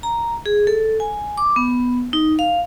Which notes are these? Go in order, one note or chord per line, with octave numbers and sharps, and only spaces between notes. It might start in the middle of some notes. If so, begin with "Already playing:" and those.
A#5
G#4
A4
G#5
D6
B3
D#4
F5